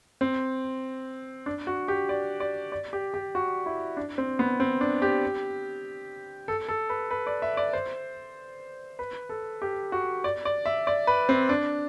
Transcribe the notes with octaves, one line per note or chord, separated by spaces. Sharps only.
C4
D4
F#4
G4
D5
D5
D5
G4
G4
F#4
E4
D4
C4
B3
C4
D4
G4
A4
A4
B4
B4
D5
E5
D5
C5
B4
A4
G4
F#4
D5
D5
E5
D5
B4
C4
D4